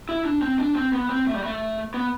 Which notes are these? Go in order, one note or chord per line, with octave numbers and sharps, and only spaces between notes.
E4
D4
C4
D4
C4
B3
C4
A3
G3
A3
B3